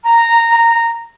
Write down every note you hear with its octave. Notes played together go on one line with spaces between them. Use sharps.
A#5